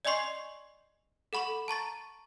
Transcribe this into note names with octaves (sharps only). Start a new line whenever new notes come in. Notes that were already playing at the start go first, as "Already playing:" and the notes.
D5 D#5 G#5 C6 C#6 C7
A4 F#5 B5 C#6 F#7
A5 A#5 C#6 A6